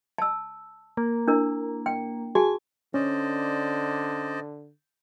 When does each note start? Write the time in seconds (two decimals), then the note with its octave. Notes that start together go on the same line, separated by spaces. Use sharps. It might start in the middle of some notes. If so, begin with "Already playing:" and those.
0.18 A5 E6
0.97 A#3
1.28 D4 E4 A#4
1.86 G5
2.35 F#4 G#4 G#5 A5
2.94 D3 C#4 C5 D5 D#5